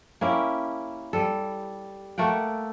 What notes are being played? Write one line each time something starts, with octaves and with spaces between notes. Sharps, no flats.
A#3 C#4 E4 G4
G3 A4
A3 A#3 F#5 G5